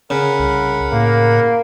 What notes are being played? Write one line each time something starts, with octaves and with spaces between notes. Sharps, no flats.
C#3 A#4 F#5 B5
C2
A2 A#3